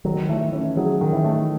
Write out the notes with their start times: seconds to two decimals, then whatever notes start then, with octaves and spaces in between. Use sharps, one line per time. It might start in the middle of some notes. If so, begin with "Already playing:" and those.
0.05 D#3 F#3
0.29 E3 A3
0.53 E3 C#4
0.77 F#3 G#4
1.01 D#3
1.13 E3
1.24 A3